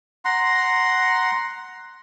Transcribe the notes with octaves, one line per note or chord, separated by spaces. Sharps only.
F#5 A#5 C6